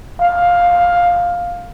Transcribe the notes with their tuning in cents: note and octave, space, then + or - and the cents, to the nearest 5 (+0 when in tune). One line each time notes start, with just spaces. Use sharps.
F5 +10